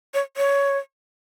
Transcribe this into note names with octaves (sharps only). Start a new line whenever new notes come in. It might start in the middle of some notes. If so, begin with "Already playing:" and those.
C#5
C#5